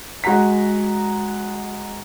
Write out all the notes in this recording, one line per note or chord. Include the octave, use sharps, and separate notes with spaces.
G#3 F#4 F#5 A#5 B6